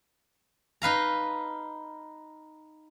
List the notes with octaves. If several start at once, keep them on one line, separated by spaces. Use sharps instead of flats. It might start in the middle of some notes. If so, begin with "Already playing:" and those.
D#4 B4 F5 A#5